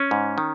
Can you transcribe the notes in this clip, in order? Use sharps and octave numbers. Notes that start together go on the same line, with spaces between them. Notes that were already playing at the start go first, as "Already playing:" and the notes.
Already playing: C#4
G#2
D#3